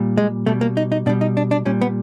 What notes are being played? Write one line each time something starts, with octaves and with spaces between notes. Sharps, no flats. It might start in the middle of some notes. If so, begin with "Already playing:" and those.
Already playing: A#2 G3
G#3
B2 G3 A3
A#3
D#4
D#4
B2 G3 D4
D#4
D4
D4
A#2 G3 C#4
B3